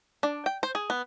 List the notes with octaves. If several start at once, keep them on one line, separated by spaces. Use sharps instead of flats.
D4
G5
C5
G#4
B3